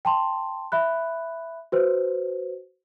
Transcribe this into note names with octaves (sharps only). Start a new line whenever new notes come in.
G5 A5 C6
E5 B5 F#6
F#4 B4 C5